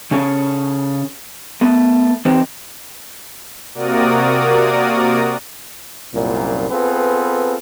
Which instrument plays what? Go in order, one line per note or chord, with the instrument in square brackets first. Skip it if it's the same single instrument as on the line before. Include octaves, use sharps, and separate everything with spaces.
[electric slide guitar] C#3 C#4 G#4 A4 C#5
A3 B3
E3 C4 D#4 G4 B4 C5
[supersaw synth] C3 A#3 F#4 A#4 D5 D#6
[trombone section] C2 F#2 A#2
B3 C4 F4 G#4 A4 B4